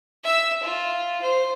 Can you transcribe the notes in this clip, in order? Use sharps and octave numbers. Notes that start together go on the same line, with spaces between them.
E5 E6
F4
C5